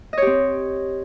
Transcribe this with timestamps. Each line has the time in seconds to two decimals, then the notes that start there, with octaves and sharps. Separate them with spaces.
0.13 D#5
0.17 C#5
0.22 G4
0.27 C4